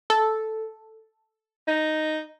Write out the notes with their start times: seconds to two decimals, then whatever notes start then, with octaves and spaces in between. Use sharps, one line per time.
0.10 A4
1.68 D#4